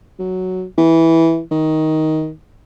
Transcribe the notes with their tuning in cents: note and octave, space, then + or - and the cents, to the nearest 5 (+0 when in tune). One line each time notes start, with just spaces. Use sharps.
F#3 +0
E3 -10
D#3 +15